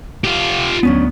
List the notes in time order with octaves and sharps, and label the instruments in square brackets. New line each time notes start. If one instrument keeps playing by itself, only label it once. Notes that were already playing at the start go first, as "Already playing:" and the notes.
[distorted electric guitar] F4 G4
[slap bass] D2 B3 [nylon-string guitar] F#3 C#4 D4